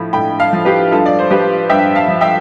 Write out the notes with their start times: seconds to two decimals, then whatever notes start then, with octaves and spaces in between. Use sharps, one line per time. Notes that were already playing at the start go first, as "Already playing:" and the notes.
Already playing: A2 F3 B5
0.13 A2 G5 B5
0.39 F5 A5
0.53 F3
0.65 G4 B4
0.91 G2 F4 A4
1.06 D5
1.19 C5
1.30 F3 G4 B4
1.69 G2 E5 G5
1.95 F5 A5
2.08 F3
2.21 E5 G5